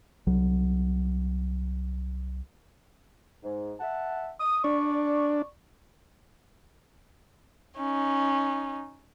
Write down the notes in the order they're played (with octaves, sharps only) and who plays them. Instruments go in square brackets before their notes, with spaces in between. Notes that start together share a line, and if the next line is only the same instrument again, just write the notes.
[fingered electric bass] C2 F#3
[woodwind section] G#2
E5 F#5 A5
D#6
[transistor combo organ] D4 [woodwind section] D5 C#6
[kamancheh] C#4 D#4